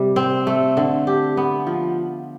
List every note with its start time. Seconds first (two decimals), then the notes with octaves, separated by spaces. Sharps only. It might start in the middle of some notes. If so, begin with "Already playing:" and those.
Already playing: C3 G3
0.16 C4
0.47 A3
0.77 D3
1.07 G4
1.37 B3
1.67 F3